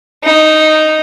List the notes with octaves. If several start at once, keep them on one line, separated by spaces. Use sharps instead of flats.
D#4